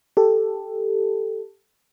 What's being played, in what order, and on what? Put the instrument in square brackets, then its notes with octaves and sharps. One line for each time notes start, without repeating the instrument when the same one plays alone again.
[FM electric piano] G4 A4